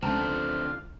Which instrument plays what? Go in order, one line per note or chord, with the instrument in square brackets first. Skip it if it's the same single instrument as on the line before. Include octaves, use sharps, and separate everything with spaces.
[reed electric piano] C#2 [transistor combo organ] D3 F4 [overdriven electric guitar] A3 C4 [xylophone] G5 A5 A#5